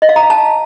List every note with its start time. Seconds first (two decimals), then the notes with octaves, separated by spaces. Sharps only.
0.02 D#5
0.09 F5
0.16 A#5
0.23 F5
0.30 A5